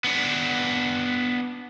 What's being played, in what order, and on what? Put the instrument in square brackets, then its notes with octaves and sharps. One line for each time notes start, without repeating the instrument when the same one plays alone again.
[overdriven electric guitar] B3 D4